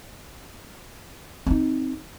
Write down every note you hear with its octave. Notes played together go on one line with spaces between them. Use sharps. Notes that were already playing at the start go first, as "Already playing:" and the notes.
C4 D#4